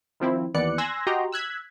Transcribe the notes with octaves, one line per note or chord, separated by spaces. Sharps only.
D#3 F3 C4 E4
D#2 E3 B3 D5 F#6 C#7
G#5 C6 E6 F#6 G#6 A#6
F#4 G4 D#5 G5 A#5 C6
E6 F#6 G#6 B6